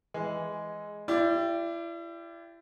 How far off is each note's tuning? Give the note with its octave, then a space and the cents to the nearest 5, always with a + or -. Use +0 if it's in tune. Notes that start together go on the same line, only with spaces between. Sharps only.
E3 +0 G#3 +0
E4 +35 G4 +0 D5 +0